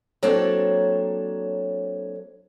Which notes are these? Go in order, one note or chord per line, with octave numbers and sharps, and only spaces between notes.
F#3 A#3 C4 D4 A4 C#5